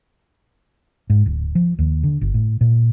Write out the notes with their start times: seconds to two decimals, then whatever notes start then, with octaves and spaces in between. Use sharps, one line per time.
1.10 G#2
1.26 D1
1.55 F3
1.79 D#2
2.03 D3
2.21 G1
2.34 A2
2.61 A#2